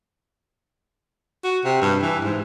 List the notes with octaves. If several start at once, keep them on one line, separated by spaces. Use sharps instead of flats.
F#4
C3
G2
E3
G#2